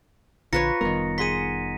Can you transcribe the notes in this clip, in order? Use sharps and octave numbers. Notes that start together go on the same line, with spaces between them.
A#1 D3 F4 B4 C#5 A#5 A#6 C#7
F1 D#3 G3 B3 A#4
G#4 F#5 C6 B6 D#7